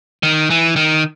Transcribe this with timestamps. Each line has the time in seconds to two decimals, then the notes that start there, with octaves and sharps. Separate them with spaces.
0.23 D#3
0.50 E3
0.76 D#3